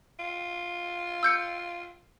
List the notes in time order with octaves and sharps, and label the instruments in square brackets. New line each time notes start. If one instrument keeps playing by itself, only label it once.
[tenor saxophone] F4
[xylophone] E6 G6 C#7